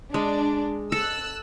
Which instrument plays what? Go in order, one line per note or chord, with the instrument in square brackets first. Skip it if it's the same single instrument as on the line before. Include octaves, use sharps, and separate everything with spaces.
[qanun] G#3 [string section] D4
[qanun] A4 [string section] E6 F#6